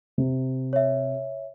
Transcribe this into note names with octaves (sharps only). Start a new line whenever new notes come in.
C3
C#5 E5